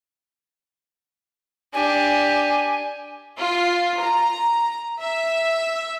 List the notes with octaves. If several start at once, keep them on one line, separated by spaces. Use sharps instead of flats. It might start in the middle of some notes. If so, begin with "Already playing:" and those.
D4 G4 G#5
F4
A#5
E5